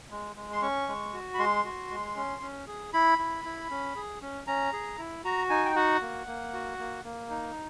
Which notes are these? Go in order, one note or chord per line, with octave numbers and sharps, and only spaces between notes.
G#3
G#3
C6
C#4 C#6
G#3
F#4
B5
G#3 C6
F#4
G#3
C#4
C#4
G#4
E4 B5
E4
E4
C#4
G#4
C#4
C#4 A#5
G#4
E4
F#4 A#5
D#4 G#5
G5
F#4 F#5
A#3
A#3
F#4
A#3
A#3
D#4